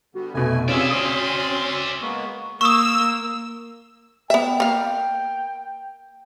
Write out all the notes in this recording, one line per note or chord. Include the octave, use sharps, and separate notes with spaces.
D3 G3 B3 F#4
F1 B2 A3 F#4 G#5
C3 C#4 F4 G#4 D5 E5 E6
C4 C#4 C6 D#6
G#3 A#3 B3 C#6
A#3 C#6 D#6 E6
B3 E5 G5
A#3 F5